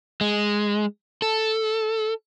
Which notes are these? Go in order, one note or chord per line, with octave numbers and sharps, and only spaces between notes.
G#3
A4